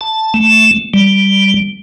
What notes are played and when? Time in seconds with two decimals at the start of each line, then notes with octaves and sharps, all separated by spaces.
0.01 A5
0.34 A3
0.94 G3